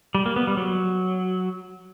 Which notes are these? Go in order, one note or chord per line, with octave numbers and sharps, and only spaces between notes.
G3
A#3
B3
G3
F#3